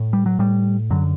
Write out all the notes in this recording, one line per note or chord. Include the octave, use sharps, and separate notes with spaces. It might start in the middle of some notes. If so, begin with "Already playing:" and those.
Already playing: A2
G3
F#3
A2 G3
F#2 D3 F#3